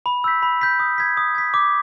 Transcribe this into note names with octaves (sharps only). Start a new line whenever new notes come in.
B5
E6 G6 B6
B5
E6 G6 B6
D#6
G#6 B6
D#6
G#6 B6
D6